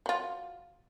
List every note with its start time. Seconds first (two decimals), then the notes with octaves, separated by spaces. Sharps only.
0.06 F#3 F4